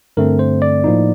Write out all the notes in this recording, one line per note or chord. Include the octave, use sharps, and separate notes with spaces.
G2 D3 A3 C4 A#4
C5
D5
A2 F3 A#3 D#4